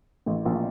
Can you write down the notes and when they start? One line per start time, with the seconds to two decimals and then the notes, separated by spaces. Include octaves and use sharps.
0.26 A1 A2
0.45 A#1 A#2